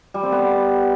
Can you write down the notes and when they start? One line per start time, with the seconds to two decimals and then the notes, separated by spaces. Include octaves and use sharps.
0.14 G3
0.23 C4
0.32 B3